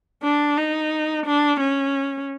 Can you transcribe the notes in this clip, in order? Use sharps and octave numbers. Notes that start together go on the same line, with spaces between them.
D4
D#4
D4
C#4